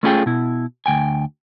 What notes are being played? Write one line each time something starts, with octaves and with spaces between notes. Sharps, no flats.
A3 C#4 E4 F4 G#4 G5
B2 E4
D2 G5 G#5